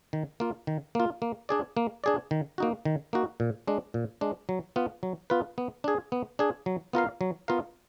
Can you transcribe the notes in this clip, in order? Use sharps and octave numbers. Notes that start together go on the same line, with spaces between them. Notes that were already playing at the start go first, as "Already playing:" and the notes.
D#3
A#3 F4
D#3
A#3 F4
A#3
D4 G#4 D5
A#3
D4 G#4 D5
D#3
A#3 D#4 F#4
D#3
A#3 D#4 F#4
A#2
G#3 D4
A#2
G#3 D4
F#3
B3 F4 B4
F#3
B3 F4 B4
B3
D4 G#4
B3
D4 G#4
F#3
B3 F4 A#4 F5
F#3
B3 F4 A#4 F5